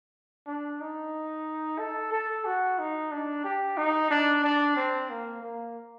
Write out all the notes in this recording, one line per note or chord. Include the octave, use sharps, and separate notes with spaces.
D4
D#4
A4
A4
F#4
D#4
D4
G4
D#4
D4
D4
C4
A#3
A#3